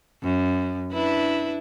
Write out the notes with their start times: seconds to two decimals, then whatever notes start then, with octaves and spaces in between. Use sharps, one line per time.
0.23 F#2
0.92 D4 E4 B4